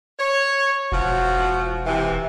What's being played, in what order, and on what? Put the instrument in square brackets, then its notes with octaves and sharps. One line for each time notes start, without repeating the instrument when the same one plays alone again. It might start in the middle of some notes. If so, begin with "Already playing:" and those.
[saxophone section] C#5
[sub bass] E1 [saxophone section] F3 F#4
[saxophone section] C3 E3